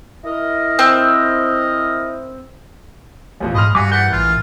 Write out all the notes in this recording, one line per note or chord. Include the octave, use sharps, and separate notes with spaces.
E4 A#4 D#5
C4
A1 F2 A#2
G#2 D#5 B5 C6 F6
G2 G3 F#4 F5 G#5 D6 B6
E3 A#4 F#5 G6 A6 B6 G7
A1 F4